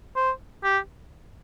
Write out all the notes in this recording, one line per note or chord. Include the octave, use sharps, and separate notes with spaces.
C5
G4